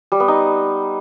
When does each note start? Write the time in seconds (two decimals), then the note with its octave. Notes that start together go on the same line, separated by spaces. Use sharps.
0.12 G3
0.20 B3
0.28 D#4